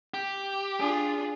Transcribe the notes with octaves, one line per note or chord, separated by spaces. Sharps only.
G4
D4 F4 G#4